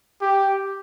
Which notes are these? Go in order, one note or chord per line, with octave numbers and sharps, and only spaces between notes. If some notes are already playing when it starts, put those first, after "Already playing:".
G4